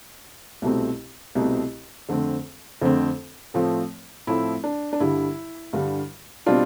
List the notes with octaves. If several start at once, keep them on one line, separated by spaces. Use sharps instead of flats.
C2 B2 A3 C4
C2 B2 A3 C4
F2 D3 A3 C4
F2 D3 A3 C4
A2 F3 A3 C4
A2 F3 A3 C4 E4
D4
D4
G2 D3 G3 E4
G2 D3 G3
B2 G3 C4 D4 F4